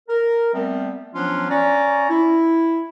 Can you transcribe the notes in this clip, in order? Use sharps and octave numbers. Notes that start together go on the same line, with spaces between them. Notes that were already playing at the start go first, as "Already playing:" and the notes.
A#4
G3 A3 B3 C4
F3 F#3 B3 C#4 D4 F4
C#4 D5 A#5
E4